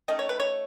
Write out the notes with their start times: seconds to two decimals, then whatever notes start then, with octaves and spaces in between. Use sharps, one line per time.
0.08 D#3 A3 C#4 D#5
0.19 C#5
0.29 B4
0.40 C#5